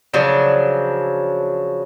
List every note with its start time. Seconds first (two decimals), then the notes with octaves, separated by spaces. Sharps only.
0.14 C#3 F3 F#3 D4